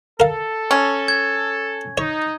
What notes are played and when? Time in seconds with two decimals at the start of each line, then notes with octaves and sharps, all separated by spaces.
0.20 A4 A#4 F5
0.71 C#4
1.08 G#6
1.98 D#4 C#5